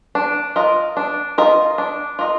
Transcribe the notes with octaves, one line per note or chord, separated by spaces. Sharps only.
D4
F4 A#4 D#5
D4
F4 A#4 D#5
D4
F4 A#4 D#5